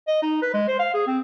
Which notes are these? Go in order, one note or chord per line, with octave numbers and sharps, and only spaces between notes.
D#5
D#4
B4
G#3
C5
F5
G#4
C4